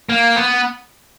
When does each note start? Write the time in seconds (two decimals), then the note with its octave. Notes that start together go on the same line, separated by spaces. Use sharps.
0.09 A#3
0.36 B3